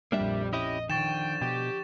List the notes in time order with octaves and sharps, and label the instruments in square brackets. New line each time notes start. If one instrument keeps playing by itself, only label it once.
[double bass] A#1 F2 [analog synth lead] G3 [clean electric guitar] A#3 D4 E5
[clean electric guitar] C#4 E4 G4 [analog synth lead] D#5
[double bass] D3 F3 [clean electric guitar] D#3 [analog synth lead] G5 [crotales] C#6 A6 E7
[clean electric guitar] B2 [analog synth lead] G4